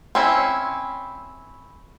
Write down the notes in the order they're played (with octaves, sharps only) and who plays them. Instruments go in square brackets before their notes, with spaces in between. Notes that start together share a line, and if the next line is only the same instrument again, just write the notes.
[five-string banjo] C4 C#4 E4